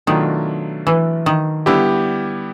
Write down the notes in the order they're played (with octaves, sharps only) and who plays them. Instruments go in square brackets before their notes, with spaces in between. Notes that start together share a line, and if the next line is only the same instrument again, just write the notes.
[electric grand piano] B2 F#3 A3 D4 F4 [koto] D#3
[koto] E3
D#3
[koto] D3 [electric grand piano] G3 B3 E4 G4